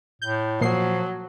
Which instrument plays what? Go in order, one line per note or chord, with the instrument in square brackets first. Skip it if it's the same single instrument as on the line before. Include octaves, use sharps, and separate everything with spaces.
[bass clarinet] A2 [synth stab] G6
[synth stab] A#2 C7 [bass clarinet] F3 [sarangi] F#3